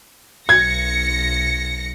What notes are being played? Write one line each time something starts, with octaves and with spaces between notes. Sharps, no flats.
B1 G#6 A#6 C#7